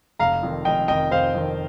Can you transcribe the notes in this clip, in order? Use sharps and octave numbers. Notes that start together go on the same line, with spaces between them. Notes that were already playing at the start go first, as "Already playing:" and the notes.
F1 F5 A#5
F2 D#3
F1 D#5 G5
F2 D#3 D#5 G5
F1 C5 F5
F2 D#3